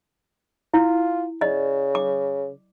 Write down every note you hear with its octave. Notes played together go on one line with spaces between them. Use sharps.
E4 F4
C#3 D5 D#5
D6